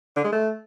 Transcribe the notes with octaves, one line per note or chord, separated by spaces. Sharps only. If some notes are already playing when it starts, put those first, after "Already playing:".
D3
G#3
A3